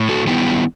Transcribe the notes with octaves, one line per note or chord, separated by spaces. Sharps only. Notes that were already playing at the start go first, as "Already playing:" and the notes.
Already playing: A2
F#4 A4
D#3 G3 B3 E4 G4